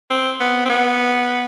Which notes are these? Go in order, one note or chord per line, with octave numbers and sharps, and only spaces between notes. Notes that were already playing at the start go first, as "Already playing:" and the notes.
C4
B3
C4
B3